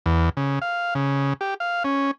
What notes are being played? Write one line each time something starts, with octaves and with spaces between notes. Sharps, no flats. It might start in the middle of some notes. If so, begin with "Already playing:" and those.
E2
C#3
F5
C#3
G4
F5
C#4